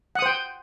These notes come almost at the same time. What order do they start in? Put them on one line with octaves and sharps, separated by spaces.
F#5 D#6 C5 G5